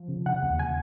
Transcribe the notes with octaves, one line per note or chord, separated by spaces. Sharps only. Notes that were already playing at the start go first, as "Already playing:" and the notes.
Already playing: F3
C#3
C#3 F#5
D#2
C#3 G#5